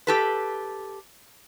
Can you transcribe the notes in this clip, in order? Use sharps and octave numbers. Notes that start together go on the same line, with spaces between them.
G4 A4 B4